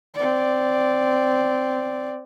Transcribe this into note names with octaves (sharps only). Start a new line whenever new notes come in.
C4 D5